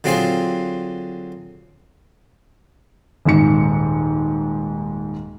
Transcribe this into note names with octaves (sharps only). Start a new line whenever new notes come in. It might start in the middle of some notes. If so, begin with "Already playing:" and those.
D3 F#3 C4 F4 G#4 C5
D#1 G#2 C#7